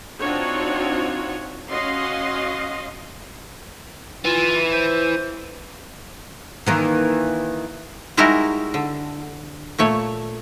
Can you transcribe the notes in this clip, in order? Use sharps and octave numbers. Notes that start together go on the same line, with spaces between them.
C4 D4 D#4 F4 F#4 C#5
C#4 F#4 D#5 F5 C6
E3 F4
C5
D#3 E3 A#3
G3 G#3 D#4 E4 F#4 A#4
D3
A#2 A3 C#5